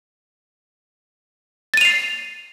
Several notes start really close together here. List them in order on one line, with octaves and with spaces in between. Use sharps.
A6 D#7 F7 C7